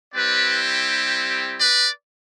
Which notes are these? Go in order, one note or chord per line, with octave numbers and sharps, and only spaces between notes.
G3 C4 E4 G4 B4 D5
B4 D5